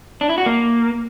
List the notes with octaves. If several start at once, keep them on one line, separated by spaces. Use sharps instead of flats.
D4
E4
F#4
A#3